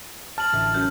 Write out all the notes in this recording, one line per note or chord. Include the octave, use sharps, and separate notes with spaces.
A5 F6 F#7
A1 D3 E5
F#2 G6